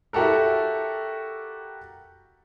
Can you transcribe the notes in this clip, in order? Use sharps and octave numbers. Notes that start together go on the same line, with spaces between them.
E4 F#4 G4 A4 A#4